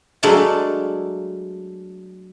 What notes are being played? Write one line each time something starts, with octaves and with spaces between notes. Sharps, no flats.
F#3 G#3 A3 D4 D5 F5